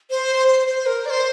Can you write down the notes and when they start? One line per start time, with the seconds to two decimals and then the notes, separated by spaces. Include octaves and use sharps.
0.10 C5
0.48 C5
0.67 C5
0.86 A#4
1.05 D5
1.10 C5